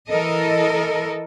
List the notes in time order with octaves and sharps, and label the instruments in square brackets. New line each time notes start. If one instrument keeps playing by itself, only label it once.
[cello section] E3 A4 A#4 D#5